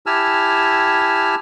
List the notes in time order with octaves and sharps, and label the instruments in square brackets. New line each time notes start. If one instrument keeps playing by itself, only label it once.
[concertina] E4 G4 G#5 A5 E6 F6